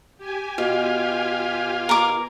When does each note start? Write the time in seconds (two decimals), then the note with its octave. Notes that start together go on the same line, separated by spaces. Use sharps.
0.18 G4 G#5
0.58 B2 F4
1.89 A#4 D6